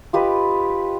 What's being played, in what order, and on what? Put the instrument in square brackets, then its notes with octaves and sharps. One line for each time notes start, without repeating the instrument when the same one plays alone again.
[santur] F4 G4 B4 D#5